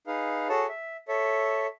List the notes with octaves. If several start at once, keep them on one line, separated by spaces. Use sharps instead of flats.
D#4 G#4 B4 F5
F#4 G#4 A4 C#5 A5
E5
A4 C#5 E5